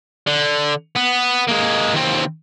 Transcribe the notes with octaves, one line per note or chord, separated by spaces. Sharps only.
D3
B3
G#3 A#3
D#2 C4